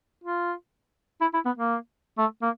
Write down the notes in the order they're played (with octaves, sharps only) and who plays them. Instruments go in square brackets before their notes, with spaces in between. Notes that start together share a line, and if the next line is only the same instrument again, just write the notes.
[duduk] F4
E4
E4
B3
A#3
A3
A#3